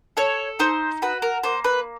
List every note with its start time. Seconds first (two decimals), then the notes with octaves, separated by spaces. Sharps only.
0.17 A4 C#5
0.59 D#4 C5
1.02 F#4 B4
1.22 A#4
1.43 A#3 C5
1.64 B4